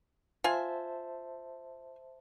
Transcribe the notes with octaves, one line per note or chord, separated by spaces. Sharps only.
F4 C5 E5 G#5 A5